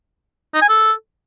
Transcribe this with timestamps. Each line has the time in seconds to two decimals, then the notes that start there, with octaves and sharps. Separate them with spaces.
0.54 D#4
0.62 G#5
0.69 A4